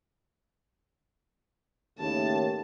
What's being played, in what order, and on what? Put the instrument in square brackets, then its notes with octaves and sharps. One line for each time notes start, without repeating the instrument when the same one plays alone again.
[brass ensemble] D#2 A2 C#3 [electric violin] A5